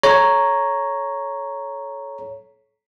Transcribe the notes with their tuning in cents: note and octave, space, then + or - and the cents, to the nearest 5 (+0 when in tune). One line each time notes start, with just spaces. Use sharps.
A4 -35 C#5 +0 A#5 +0